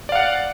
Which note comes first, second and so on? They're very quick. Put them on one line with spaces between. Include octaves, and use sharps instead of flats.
D5 F5 F#5